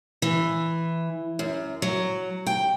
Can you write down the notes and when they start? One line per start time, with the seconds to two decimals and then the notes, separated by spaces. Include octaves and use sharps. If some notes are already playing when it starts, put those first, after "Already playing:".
0.22 E3
1.39 F#2
1.82 F#3
2.47 G5